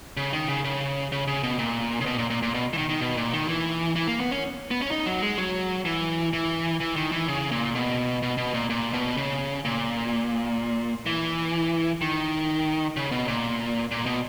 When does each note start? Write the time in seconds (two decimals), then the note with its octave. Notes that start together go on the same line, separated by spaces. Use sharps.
0.17 C#3
0.33 D#3
0.48 C#3
0.64 C#3
1.12 C#3
1.27 C#3
1.43 B2
1.59 A#2
2.01 C#3
2.06 B2
2.18 A#2
2.30 A#2
2.42 A#2
2.54 B2
2.73 E3
2.77 D#3
2.89 D#3
3.01 B2
3.17 A#2
3.33 D#3
3.48 E3
3.96 E3
4.08 A#3
4.20 B3
4.31 C#4
4.71 B3
4.81 C#4
4.91 D#4
5.06 F#3
5.22 G#3
5.38 F#3
5.85 E3
6.33 E3
6.80 E3
6.96 D#3
7.12 E3
7.28 C#3
7.51 A#2
7.75 B2
8.22 B2
8.38 B2
8.54 A#2
8.70 A#2
8.93 B2
9.17 C#3
9.65 A#2
11.06 E3
12.01 D#3
12.97 C#3
13.11 B2
13.28 A#2
13.91 A#2
14.06 B2